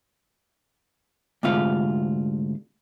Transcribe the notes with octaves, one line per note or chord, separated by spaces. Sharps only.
D2 G#2 C3 F4 F5